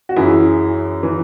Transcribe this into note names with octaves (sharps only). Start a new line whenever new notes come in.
F#4
F#2 E3 E4 G#4
E3